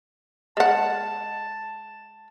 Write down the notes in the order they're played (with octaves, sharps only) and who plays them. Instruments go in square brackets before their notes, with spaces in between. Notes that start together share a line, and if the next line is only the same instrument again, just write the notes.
[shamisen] G#3 F#5 [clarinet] A5